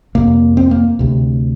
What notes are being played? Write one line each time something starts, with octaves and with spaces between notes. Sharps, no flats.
F2 C3 A#3
C4
A#3
D2 C3